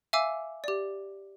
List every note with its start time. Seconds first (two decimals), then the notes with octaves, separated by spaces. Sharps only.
0.13 E5 F5 G#5 D6 E6
0.64 G4 D5